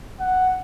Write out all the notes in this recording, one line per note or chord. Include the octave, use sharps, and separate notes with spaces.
F#5